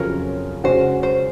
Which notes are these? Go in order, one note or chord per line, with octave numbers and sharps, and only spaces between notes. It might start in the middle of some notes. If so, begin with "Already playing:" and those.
Already playing: F2 C#3 F#3 C#4 F4 A#4 C#5
C#3 G#3 C#4 F#4 C5
C5